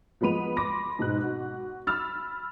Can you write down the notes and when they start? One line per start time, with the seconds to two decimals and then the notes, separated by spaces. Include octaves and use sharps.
0.21 F3 G#3 B3 B5 D#7 F7
0.56 B5 C6 D6 A#6
0.99 G#2 B2 G#3 D#4 F#6
1.22 F#4
1.87 B5 E6 F6 A6